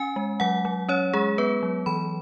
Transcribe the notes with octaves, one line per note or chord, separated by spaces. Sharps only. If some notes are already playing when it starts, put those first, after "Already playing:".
Already playing: C#4 G#5
G#3
F#3 F#5
F#3
C#4 C#5
G#3 G#4
B3 B4
F#3
E3 B5